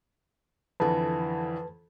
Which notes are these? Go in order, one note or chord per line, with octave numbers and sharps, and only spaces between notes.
F2 D3 E3 B4 A5